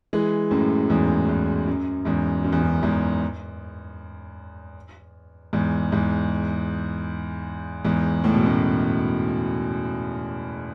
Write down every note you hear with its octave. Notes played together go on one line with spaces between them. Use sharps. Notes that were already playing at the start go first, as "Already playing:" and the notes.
E3 G#3
F#2 A2
E2 G#2
E2
F#2
E2 G#2
F#2
E2
F#2
E2 G#2
E2 G#2
E2 G#2
E2 G#2
A2
B2
F#2 A2